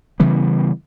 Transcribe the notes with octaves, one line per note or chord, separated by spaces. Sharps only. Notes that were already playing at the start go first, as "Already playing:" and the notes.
C#3 E3 G3 B3